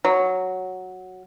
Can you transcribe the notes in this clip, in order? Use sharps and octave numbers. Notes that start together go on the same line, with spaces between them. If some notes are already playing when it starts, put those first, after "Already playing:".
F#3